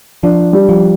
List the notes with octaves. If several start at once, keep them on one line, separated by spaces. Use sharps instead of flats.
F3 D4
G3
F3